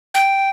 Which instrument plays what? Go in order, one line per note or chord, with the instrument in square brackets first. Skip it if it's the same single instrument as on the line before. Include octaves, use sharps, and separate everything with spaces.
[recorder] G5